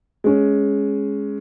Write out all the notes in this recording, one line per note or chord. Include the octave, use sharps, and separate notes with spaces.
G#3 C#4